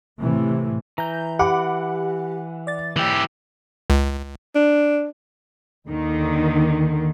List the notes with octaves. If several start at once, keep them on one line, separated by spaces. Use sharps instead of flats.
A2 C3 E3 A3
E3 A#5 G6
G4 F#5 B5 D6
D5 A6
E3 G4
C#2
D4
D#2 D3 D#3